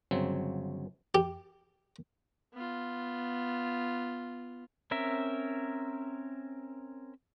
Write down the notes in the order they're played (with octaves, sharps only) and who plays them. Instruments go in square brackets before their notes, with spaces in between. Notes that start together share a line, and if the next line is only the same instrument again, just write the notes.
[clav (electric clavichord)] G1 C#3 F#3 C4
[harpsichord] G4
[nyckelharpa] B3 F4
[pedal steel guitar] C4 C#4 A#4 E5